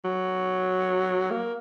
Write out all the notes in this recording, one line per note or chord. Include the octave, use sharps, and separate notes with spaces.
F#3
A#3